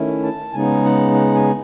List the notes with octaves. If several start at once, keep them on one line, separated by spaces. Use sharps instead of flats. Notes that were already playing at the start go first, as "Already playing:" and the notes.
Already playing: D#3 A3 C#4 E4
A5
C#3 G#3 B3 D#4 G#5
F#5
F#5
G#5